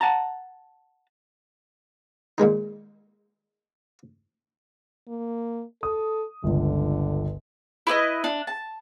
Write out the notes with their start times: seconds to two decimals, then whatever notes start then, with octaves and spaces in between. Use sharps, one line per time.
0.01 F#5 A5 A#5
2.38 A#2 D#3 G#3 D#4
5.08 A#3
5.83 A4 D#6
6.44 G1 C#2 D3
7.87 E4 B4 D5 D#5
8.24 D4
8.47 A5